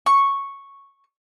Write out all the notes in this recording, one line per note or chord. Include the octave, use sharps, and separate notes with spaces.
C#6